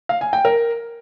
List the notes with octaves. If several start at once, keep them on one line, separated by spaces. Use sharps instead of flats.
F5
G#5
G5
A#4